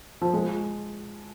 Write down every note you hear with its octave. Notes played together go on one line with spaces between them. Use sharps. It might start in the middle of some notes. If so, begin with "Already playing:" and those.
F3
G#3